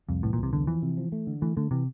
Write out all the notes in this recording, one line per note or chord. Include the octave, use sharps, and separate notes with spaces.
C2 F2
A2 E3
A#2
C2
C3
E2 D3
E3 F3
C3
F3
A3
D3
E3 A3
D3 A3
C3 E3